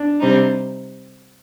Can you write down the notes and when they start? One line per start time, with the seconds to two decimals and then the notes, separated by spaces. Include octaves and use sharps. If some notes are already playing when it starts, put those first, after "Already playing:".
Already playing: D4
0.19 C3 G3 C4 D#4